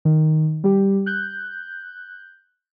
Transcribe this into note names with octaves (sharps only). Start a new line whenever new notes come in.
D#3
G3 G4
F#6 G6